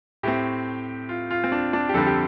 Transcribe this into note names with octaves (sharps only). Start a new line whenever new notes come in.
A2 A3 C4 G4
F4
F4
C4
D4
D4
G4
F2 D3 G3 C4 A4
G4